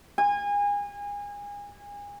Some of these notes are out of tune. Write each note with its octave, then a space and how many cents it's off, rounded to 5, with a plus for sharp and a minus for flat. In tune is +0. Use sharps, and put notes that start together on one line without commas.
G#5 -30